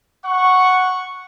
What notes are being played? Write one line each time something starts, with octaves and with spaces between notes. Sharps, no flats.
F#5 C#6